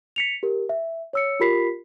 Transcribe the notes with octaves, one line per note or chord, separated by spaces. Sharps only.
B6 C#7 F7
G4 A#4
E5
C#5 E6 C#7
F4 G4 A#4 B5 B6 C7